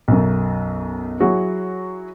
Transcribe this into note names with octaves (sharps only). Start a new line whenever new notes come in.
B1 F#2
F#3 E4 F#4 G#4